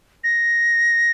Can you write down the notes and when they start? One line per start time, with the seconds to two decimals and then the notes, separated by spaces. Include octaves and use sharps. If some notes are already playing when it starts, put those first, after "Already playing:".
0.24 A#6